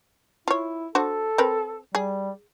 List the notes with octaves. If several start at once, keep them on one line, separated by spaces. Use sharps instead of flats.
E4 F4 C#5
D4 F#4 A4 C5
C4 A#4 B4
G3 G#4